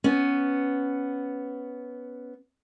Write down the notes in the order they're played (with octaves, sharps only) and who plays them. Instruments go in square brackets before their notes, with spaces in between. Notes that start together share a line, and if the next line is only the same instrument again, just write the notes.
[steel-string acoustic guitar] B3 C#4